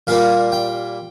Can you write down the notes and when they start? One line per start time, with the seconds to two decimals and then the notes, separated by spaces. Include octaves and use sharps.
0.07 A#2 G3 A#3 F5
0.52 G5